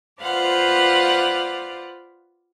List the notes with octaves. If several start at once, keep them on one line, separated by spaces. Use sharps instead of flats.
F4 B4 C5 D5 F5 F#5